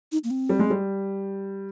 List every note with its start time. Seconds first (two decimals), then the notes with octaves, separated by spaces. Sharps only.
0.12 D#4
0.24 A#3
0.30 C4
0.49 G3
0.59 G#3
0.70 G3